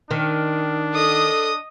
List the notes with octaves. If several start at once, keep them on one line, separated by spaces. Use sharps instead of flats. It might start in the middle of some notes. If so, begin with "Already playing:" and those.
D#3 D4
A4 D#5 D#6